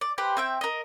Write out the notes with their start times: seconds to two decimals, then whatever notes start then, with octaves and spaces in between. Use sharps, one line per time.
0.01 D5
0.18 G4 B4 C5
0.37 C4 E5 G5
0.61 A#4 D#5